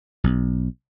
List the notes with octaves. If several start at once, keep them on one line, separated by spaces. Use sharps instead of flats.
B1